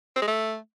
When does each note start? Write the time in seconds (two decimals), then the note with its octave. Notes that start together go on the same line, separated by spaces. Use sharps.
0.16 C4
0.22 G#3
0.28 A3